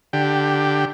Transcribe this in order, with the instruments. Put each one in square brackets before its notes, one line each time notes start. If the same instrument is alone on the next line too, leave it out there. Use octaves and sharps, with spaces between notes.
[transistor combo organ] D3 G4